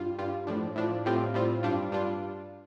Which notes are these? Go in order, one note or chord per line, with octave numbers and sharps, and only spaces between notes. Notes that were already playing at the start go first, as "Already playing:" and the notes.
Already playing: G2 G3 F4
G2 G3 F4
A2 F3 D4
A2 F3 D4
A2 G3 C4 F4
A2 G3 C4 F4
G2 G3 D4 F4
G2 G3 D4 F4